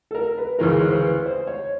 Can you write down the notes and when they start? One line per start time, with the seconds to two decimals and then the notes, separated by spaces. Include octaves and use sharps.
0.11 A4
0.15 A#4
0.38 B4
0.59 D2 C#3 E3 G#3 A#4
0.88 C5
0.92 B4
1.26 C5
1.47 C#5